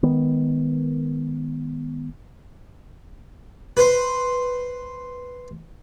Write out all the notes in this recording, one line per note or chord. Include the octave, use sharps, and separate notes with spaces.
D#3 G#3 B3
B4 C5